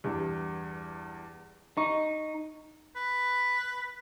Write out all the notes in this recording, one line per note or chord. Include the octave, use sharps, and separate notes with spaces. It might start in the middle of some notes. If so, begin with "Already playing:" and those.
E2 G2
D#4 C#6
B4